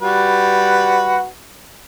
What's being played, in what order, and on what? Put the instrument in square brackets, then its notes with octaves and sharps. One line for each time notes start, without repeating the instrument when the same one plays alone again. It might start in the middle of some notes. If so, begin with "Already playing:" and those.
[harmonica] G3 F#4 B4